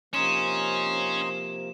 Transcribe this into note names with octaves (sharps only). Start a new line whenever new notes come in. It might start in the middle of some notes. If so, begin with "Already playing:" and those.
C3 F3 A#3 C#4 D#4 C6 E7